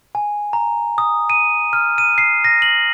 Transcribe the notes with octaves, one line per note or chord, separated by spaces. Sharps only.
G#5
A#5
D#6
D#7
F6
D#7
C7
A#6
F#7